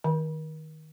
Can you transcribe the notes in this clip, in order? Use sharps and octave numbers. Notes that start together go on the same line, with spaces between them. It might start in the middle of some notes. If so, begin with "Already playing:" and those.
D#3